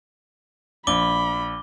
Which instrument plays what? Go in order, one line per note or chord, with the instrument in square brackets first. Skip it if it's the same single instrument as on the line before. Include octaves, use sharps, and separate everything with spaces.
[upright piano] A#1 [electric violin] B5 [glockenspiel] D6 G7